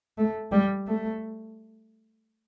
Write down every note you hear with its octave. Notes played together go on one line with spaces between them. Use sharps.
A3
G3
A3